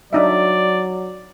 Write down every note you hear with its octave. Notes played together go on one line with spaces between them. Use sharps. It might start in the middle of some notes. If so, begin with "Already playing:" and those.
F#3 D4 D#4 D5 E5